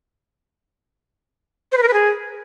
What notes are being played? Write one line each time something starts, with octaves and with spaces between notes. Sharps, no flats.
C5
B4
A#4
B4
G#4